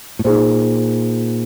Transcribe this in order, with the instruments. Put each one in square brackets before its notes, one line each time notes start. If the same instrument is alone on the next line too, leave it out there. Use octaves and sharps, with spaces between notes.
[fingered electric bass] A2
[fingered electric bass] A#2 [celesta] D#4 G#4 C5